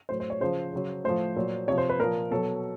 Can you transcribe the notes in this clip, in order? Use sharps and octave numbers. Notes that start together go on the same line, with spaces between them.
A2 F#3 C5
C5
C#5
C#3 F3 C5
C#3 F#3
A2 F3 C5
A#2 F#3
C3 F3 C#5
C5
B4
A#2 F3 A#4
B2 F#3 A4